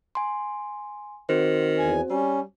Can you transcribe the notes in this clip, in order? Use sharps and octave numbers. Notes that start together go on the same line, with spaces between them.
G#5 C6
D#3 C4 F#4 C5
E2 G#5
G3 C#4